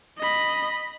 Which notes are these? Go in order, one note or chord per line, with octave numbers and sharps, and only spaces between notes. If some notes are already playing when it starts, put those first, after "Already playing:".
D#5 B5